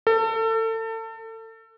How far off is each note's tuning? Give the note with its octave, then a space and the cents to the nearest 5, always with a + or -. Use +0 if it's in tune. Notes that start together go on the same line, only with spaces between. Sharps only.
A4 +30